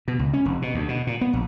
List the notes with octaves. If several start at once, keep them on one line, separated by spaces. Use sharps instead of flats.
B2
C#2
C#4
F1
B2
D2
B2
A#2
B3
A#1